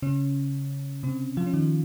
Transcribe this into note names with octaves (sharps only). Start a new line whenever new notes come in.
C#3 C#4
C3 C4
F3 F4
C#4
D#3 D#4